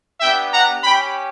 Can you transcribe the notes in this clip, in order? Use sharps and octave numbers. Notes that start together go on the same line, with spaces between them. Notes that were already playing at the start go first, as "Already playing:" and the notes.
B3 D4 G4 E5 G5
F#5 A#5
C#4 G4 G5 B5